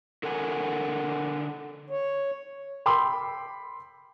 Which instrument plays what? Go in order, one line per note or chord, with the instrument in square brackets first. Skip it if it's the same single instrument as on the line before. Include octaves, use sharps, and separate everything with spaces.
[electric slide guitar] D3 A4 A#4 F#5 G#5
[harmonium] C#5
[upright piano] G5 B5 C6 D6 E6